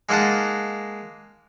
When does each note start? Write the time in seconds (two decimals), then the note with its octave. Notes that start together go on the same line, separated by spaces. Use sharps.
0.09 G#3 A#3 D#4 D#5 F#5 A5